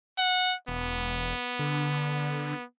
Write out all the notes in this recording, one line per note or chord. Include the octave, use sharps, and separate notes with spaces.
F#5
E1 B3
D3